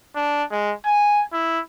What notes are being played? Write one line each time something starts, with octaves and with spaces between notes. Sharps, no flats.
D4
G#3
G#5
E4